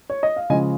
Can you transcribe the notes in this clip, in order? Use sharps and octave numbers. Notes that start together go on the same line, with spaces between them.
C#5
D#5
F5
C#3 F3 G#3 D#5 G#5